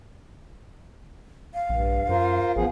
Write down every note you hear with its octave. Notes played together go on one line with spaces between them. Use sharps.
F5
A#1 G2
F#2 F4 A#4 C5
A1 F3 B3 G#4